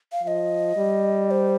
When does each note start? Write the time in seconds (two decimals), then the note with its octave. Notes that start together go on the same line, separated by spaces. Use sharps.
0.12 F5
0.23 F3 F5
0.27 D#5
0.77 G3
1.31 C5